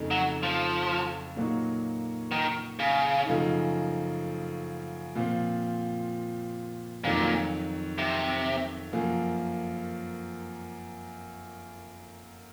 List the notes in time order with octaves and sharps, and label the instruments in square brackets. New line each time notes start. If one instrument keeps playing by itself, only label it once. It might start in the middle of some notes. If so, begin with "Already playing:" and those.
Already playing: [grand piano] F2 C#3 A3 D#4
[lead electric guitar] F#3
F3
[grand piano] A#2 F#3 A#3 D#4 F#4
[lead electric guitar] D#3
C#3
[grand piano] F#2 C#3 F3 A3 D#4
A#2 F3 C4 F4
[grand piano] F2 D#3 F#3 [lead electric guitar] A#2
[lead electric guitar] C3
[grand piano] F#2 F3 A#3